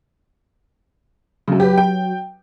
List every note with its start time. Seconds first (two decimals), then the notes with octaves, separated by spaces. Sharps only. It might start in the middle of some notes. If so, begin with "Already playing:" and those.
1.48 F#2 C#3 F#3
1.60 G4 B4
1.78 G5